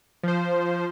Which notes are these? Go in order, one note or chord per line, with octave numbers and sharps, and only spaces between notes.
F3 C5